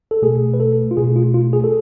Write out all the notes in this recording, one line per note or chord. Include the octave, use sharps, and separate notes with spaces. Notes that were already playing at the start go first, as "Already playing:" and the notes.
A4
B2 A3 G#4
B4
A4
F4
B2 A3 G#4
F4
F4
G#4
A4